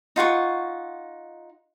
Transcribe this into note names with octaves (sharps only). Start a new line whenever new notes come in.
D#4 F4 F#5 C#6